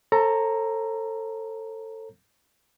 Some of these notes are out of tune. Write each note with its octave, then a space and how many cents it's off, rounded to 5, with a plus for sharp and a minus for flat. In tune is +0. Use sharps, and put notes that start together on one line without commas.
A4 +20 C5 +45 A#5 +0